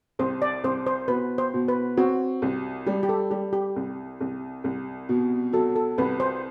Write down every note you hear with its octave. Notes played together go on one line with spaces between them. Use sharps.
C2 C5
D5
C2 C5
C5
B2 B4
C5
B2
B4
C4 F#4
C2
G3 G4
G4
A4
G3 G4
G4
C2
C2
C2
B2
F#3 A4
A4
C2 B4
C5